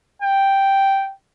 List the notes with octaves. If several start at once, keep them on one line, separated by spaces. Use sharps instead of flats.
G5